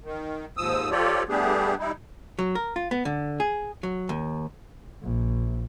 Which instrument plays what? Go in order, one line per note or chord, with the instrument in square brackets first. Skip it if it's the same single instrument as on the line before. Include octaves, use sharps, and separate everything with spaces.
[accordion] D#3
D#2 G#2 F3 D#6 E6
F3 F4 G4 A4 C#5 D5
G3 A3 B3 D4 G4 G#4
G3 D#4 E4
[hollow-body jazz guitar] F#3
A#4
F4
B3
D3
G#4
F#3
D#2
[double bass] A#1